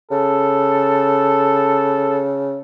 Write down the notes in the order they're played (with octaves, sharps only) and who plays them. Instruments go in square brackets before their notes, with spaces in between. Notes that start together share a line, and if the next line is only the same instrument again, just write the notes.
[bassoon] C#3 [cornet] A4